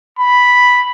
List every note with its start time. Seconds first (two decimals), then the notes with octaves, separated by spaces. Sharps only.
0.19 B5